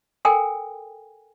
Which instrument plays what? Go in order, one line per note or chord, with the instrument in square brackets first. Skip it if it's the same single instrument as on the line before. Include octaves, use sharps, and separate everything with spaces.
[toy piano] A4 A#4 G5 G#5